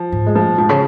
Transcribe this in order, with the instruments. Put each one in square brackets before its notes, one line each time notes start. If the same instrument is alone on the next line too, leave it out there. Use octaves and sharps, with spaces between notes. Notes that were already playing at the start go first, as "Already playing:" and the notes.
Already playing: [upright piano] F3
[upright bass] G#2
[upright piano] G#3
F3
[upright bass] A#2
[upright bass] G#2 [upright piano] F3
[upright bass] C#3